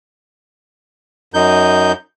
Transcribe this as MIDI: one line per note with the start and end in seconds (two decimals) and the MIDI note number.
1.34 1.92 42
1.34 1.92 63
1.34 1.92 91